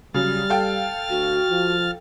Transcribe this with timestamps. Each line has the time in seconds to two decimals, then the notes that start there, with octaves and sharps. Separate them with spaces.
0.14 C#3 F#3 G3 F6 A6
0.50 A4 F5 G5
1.09 D2 F#4
1.49 F3